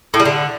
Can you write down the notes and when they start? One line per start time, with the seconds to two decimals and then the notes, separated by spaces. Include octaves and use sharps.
0.14 A2
0.20 G3
0.25 D3